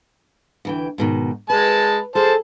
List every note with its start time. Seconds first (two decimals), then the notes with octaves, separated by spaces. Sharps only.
0.65 D2 E3 G5
0.98 G#2 B2 D#3
1.50 G#3 B4 A5
2.15 G#4 A4 C5 A5